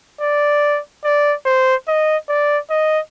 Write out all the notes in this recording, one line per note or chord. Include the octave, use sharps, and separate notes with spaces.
D5
D5
C5
D#5
D5
D#5